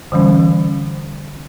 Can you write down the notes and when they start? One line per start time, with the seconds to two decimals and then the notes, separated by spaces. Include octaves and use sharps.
0.12 D3 E3 G3 C#4